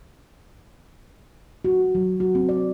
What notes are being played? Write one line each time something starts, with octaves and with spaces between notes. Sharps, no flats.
F#4
F#3
F#4
C4
D5